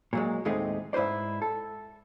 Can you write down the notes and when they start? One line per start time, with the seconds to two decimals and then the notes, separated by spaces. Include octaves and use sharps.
0.13 A#2 F#3 G#3
0.45 D#2 A2 G#3 A3 C4 D#4
0.93 G#2 E4 B4 C5 D5
1.42 A4